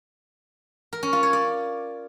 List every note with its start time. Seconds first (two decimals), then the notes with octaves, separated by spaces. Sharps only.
0.93 A#4
1.03 C#4
1.13 F4
1.23 C#5
1.33 D5